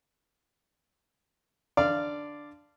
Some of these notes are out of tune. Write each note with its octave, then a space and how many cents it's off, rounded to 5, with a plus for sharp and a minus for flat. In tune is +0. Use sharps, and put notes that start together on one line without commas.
D3 +0 D5 +0 F5 -15